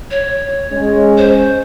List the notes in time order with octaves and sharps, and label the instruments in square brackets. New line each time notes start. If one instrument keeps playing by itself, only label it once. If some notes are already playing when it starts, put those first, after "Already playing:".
[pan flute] C#5
[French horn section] G#3 C#4
[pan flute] C5